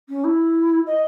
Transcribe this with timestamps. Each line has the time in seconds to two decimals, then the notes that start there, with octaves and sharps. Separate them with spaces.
0.09 C#4
0.24 E4
0.87 D#5